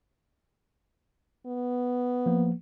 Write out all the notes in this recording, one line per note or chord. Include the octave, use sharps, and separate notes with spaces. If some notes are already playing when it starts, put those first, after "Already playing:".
B3
F3 A#3